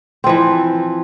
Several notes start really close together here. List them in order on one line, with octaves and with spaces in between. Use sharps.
C4 F3 E3